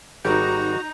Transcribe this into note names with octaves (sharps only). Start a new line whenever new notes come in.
G#1 G3 D#4 F#4 G4 A#5 G6